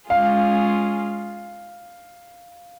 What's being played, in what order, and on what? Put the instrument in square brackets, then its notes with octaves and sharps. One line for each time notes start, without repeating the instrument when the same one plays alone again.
[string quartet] G#3 C#4 F4 G#4 [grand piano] F5